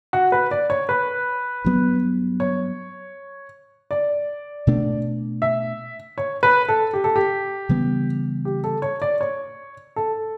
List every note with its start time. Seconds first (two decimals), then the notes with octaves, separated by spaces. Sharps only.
0.13 F#4
0.32 B4
0.51 D5
0.70 C#5
0.89 B4
1.65 G2 F#3 B3
2.40 C#5
3.91 D5
4.67 B2 A3 D4
5.42 E5
6.18 C#5
6.43 B4
6.68 A4
6.94 G4
7.04 A4
7.16 G4
7.69 C#3 E3 G3 B3
8.45 G4
8.64 A4
8.82 C#5
9.02 D5
9.21 C#5
9.96 A4